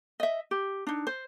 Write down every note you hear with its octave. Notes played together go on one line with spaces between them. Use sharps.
D#5 E5
G4
D4 D#4
C5